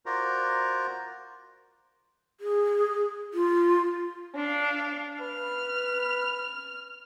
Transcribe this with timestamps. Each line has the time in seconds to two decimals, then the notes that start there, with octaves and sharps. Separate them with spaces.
0.06 F4 F#4 A#4 C5 D5 A#5
2.41 G#4
3.34 F4
4.36 D4 F5
5.21 B4 F6